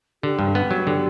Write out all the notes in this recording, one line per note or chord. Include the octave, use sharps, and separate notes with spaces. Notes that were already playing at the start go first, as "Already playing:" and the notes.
D3 G4
G2
B3
F#3
D3